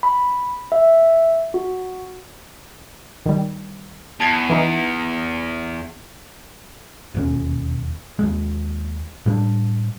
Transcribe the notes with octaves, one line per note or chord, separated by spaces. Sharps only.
B5
E5
F#4
D#3 G3
E2 A5 G#6
E3 D#4
E1 D#2 C#4
D#2 G#3
A2 G3 A3 D4